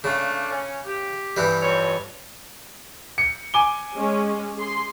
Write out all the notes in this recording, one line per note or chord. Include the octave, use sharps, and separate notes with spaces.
C#3 A3 A#3 D4
C#4
G4
G2 E3 G3
F2 C#5
C#7
G#5 D6 G7
G#3 C#4
G#4 C6